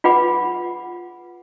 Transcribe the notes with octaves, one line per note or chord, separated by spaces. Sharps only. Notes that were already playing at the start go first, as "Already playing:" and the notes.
F4 G#4 B4 F#5 B5 D6